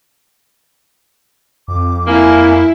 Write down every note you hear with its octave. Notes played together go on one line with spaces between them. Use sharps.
F2 D6
A#3 E4 G#5